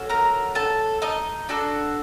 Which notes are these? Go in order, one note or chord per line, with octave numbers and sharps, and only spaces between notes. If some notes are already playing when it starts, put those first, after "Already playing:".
Already playing: C#4 F#4 A4
A#4 A#5
A4 A5
D#4 D#5
D4 F#4 A4